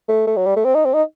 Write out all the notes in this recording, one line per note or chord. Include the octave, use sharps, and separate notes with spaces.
A3
A3
F#3
G3
A3
C4
D#4
C4
D#4